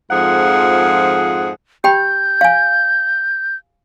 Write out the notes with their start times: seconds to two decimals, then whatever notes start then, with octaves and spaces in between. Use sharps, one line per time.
0.11 F2 G#2 F3 G#4 F#5
1.84 G4 G5 B5 G6
2.41 F5 G#5